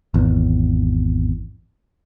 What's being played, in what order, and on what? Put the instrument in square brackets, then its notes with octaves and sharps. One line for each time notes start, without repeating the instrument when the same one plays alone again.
[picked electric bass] G#1 E2